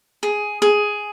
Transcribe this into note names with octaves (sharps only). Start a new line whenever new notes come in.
G#4
G#4